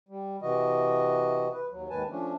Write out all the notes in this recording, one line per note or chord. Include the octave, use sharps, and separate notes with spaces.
G3
C3 E3 F#4 D#5
B4
D#2 F#3
D#2 G#2 D#3 B4 G#5 A5
F3 A3 C#4 D4